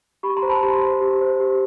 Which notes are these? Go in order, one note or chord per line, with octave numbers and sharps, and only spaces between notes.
G4 B5 C#6
A#5 C6
C5
A5 B5
G4 A#5 C6
C5
G4
C5
G4